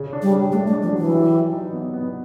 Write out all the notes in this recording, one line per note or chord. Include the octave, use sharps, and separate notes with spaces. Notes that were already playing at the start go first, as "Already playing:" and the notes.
Already playing: C#3
D4
G3
C#3
A3 D4
G#3
D4
F3
F#3
E3
G4
G4
D#4
B3
B3